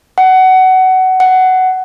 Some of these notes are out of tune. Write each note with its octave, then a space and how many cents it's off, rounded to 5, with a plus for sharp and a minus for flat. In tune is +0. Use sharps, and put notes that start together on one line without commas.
F#5 +20
F#5 +10